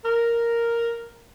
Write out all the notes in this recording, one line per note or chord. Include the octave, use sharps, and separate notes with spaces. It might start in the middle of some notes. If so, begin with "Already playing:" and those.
A#4